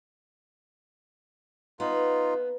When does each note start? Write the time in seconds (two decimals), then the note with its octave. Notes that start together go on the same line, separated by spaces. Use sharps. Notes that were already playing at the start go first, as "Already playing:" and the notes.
1.80 B3 D#4 F4